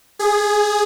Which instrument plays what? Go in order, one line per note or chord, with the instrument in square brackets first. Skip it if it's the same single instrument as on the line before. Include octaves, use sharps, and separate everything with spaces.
[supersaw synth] G#4